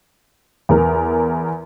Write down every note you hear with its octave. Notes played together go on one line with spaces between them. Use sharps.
E2 A#4